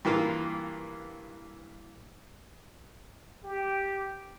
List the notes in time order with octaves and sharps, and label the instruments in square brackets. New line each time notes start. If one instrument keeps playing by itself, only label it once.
[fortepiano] G2 E3 A#3 F4
[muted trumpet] G4